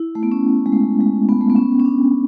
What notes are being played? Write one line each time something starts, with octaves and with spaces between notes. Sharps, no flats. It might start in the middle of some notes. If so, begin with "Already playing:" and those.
Already playing: E4
A3
B3
C#4
G#3
A3
G#3
B3
A3
B3
C#4
C#4
D4